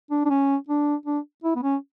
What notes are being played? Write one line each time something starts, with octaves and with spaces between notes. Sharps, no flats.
D4
D4
C#4
D4
D4
E4
B3
C#4